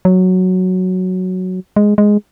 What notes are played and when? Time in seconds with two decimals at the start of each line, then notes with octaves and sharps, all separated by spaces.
0.05 F#3
1.76 G#3
1.98 G#3